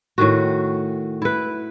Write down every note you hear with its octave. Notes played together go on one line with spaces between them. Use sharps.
A2 D#3 F#4
E4 B4